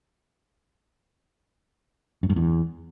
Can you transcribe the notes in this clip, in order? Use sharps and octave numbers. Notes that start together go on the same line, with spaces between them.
F#2
G2
E2